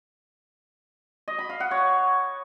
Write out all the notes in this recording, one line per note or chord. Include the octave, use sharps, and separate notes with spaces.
D#5
B5
F5
F#5
C#5